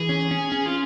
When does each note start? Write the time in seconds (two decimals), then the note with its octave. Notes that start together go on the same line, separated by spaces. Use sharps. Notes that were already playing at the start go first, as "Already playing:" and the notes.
Already playing: E3 G#4
0.09 C#4
0.31 C#4
0.52 C#4
0.66 F4